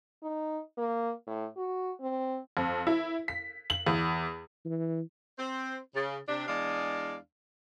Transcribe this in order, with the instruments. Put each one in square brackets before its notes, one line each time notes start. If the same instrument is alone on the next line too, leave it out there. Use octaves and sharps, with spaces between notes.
[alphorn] D#4
A#3
A2
F#4
C4
[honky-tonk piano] F2
E4
B6
F#7
E2
[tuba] E3
[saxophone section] C4 C5
C#3
C3 D4
E2 G#3 D4 D5 D#5 F5